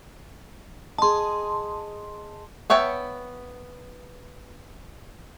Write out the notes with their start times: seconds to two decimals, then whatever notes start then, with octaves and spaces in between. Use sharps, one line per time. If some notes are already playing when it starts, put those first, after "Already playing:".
0.98 G#4 D#5 A5 C6
2.70 B3 C#5 E5 G5 A5